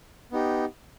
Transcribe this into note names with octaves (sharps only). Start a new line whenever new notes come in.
B3 D#4 G4